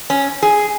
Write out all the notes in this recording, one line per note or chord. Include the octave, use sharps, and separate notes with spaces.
C#4
G#4